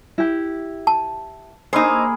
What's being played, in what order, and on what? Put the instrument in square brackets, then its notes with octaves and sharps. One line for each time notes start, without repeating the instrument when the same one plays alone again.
[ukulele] E4 G4
[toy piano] A5
[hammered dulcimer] A#3 E4 G#4 [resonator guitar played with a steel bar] D#4 C5